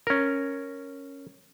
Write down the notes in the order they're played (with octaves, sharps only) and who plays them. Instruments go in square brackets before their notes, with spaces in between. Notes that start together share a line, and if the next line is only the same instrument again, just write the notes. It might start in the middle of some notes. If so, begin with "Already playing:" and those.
[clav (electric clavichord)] C#4 A#4